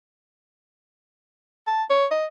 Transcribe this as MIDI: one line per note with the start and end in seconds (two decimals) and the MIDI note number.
1.67 1.84 81
1.90 2.06 73
2.11 2.26 75